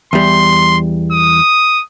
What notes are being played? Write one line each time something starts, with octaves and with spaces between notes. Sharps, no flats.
E2 G3 C6
D#6